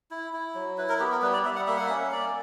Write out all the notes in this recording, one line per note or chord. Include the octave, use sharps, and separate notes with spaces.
E4
E4
F#3
E4 B4
A#4
B3 G4
A#4
G3 B4
D5
G3 E5
F#5
A#3 E5
F#5
E5
C#4
A#3 D5